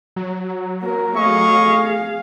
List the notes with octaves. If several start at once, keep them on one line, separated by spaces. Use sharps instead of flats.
F#3
A#3 A#4
A3 G#4 D#5 F5 C#6